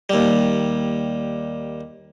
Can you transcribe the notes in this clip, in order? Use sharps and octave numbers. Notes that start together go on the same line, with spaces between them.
D#2 G3